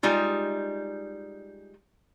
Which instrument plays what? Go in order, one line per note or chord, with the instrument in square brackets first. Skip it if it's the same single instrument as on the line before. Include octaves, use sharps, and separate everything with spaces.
[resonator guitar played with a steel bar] G3 G#3 D#4 F4